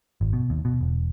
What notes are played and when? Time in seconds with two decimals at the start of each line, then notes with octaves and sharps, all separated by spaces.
0.21 G#1
0.33 B2
0.50 D#2
0.65 B2
0.81 E1